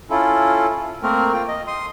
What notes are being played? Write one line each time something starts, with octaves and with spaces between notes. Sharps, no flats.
C#4 E4 F4 A4
A3 A#3 C4 A#4
F4 G5
D#5
C6 D#6